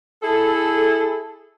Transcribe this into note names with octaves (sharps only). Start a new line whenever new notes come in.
E4 G#4 A4